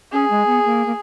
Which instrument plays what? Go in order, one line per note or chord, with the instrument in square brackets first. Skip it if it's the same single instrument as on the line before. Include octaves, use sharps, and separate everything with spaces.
[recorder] C#4 [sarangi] G#4
[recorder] G#3
B3
A#3
A#3